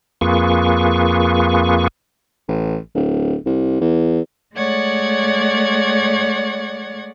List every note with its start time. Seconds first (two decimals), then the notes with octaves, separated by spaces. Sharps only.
0.21 F2 A#3 F4 G#4 B4 C#6
2.48 A1
2.95 D1
3.46 C2
3.81 E2
4.56 G#3 A3 C#5 D5 F#5 G#6